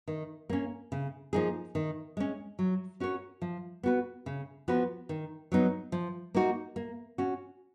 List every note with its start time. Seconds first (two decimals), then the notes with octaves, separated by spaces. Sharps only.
0.08 D#3
0.50 A#3 C#4
0.92 C#3
1.33 F3 A#3 D#4 G#4
1.75 D#3
2.17 G#3 C#4
2.59 F#3
3.00 C#4 F#4 A#4 C#5
3.42 F3
3.83 B3 F#4 B4
4.26 C#3
4.68 F3 B3 F#4 B4
5.09 D#3
5.52 F#3 B3 D#4
5.92 F3
6.34 A#3 D#4 F#4 A#4
6.76 A#3
7.18 C#4 F#4